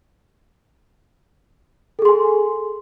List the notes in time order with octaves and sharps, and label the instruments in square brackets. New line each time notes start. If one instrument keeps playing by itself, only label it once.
[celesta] A4
G#4
C6
G#5